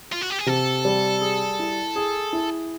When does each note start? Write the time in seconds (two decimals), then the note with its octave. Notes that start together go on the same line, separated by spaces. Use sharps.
0.12 F4
0.21 F#4
0.30 G4
0.39 G#4
0.46 C3 A4
0.85 G3
1.21 G#4
1.59 E4
1.96 G#4
2.33 E4